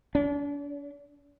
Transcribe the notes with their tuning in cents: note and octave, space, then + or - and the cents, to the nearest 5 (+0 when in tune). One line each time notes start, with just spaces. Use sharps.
D4 -40